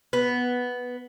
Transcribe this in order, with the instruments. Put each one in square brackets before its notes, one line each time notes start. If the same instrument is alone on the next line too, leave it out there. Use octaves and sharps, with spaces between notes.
[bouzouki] B3